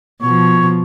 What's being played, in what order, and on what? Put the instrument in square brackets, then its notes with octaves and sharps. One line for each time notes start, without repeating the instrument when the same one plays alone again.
[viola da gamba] B2 F3 [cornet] C#5